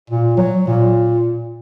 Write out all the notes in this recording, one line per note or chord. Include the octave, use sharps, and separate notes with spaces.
A#2
F#3
A#2